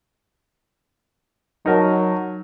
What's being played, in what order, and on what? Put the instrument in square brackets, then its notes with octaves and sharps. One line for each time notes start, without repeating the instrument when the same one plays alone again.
[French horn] F#3 [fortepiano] D#4 A#4 A5